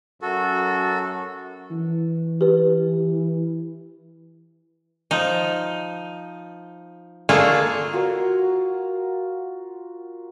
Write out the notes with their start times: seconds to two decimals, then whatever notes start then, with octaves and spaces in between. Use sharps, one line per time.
0.22 F#2 F#4 A4
1.71 E3
2.41 G4 B4
5.11 F3 D#4
7.29 D3 A3 A#3 F4 F#4 G#4
7.93 F4 F#4 A#4 D5